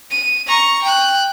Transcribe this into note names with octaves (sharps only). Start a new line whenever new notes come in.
D#7
A#5 C#6
G5 F#6